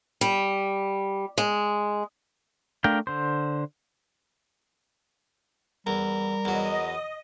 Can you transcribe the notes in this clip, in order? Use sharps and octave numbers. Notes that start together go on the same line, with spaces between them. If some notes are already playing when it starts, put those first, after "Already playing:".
G3
G#3
A3 D4 A#4 F5 G5
D3 C5
E2 G3 A#4
E2 F#3 D#5